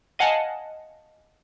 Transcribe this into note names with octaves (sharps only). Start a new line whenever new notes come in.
D#5 F5 F#5 G#5 A5